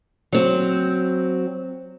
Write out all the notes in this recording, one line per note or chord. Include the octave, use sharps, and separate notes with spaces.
F#3 C4